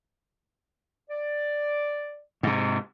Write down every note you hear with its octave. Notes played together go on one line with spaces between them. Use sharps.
D5
G#2 C3